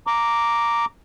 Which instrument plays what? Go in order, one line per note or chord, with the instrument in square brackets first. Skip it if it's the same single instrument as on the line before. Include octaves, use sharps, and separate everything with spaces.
[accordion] A#5 D6